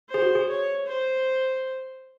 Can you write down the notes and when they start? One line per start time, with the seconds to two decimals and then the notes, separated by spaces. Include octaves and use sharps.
0.09 G#4 C5
0.22 F#4
0.35 G#4
0.48 C#5
0.87 C5